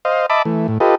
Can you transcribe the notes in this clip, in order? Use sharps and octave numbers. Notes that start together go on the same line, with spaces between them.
C5 D#5 F5
D#5 E5 A5 B5 D6
E3 A3
A2
F4 G4 A4 B4 D#5